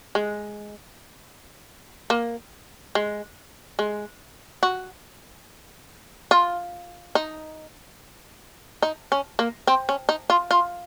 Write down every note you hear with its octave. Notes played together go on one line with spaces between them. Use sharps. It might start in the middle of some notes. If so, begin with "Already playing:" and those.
G#3
A#3
G#3
G#3
F#4
F4
D#4
D#4
C#4
A#3
C4
C#4
D#4
F4
F4